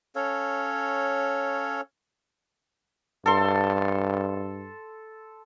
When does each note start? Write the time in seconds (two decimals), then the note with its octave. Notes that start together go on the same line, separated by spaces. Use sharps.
0.16 C#4 A4 C#5 F5
3.26 G2 A4 C6